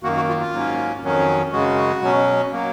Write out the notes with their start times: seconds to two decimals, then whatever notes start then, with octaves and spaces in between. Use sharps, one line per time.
0.03 F#2 D#3 A#3 F#4
0.16 F#4
0.28 F4
0.40 F4
0.52 G#2 F#3 A#3 C#4
1.02 F2 D#3 F#3 C#4
1.52 F#2 C#3 G#3 F#4
2.02 B2 F#3 C#4
2.51 F#3 A#3